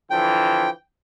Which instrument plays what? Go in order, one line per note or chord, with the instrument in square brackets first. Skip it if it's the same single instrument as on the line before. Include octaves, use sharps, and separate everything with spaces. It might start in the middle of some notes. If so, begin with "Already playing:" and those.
[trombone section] D3 E3 F3 [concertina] G5